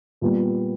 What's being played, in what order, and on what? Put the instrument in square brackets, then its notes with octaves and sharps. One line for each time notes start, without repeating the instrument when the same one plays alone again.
[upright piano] A#2 G3 B3